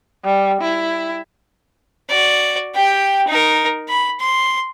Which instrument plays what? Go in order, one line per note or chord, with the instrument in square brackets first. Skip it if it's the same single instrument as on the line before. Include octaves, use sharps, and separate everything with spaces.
[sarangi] G3
E4
[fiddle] F#4 D5
G4 G5
D#4 A#4
B5
C6